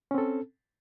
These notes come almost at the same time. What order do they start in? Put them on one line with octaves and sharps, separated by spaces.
C#4 C4 A4